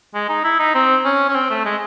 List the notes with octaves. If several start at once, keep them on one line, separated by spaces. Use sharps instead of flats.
G#3
D#4
E4
D#4
C4
C#4
C#4
C4
A3
G#3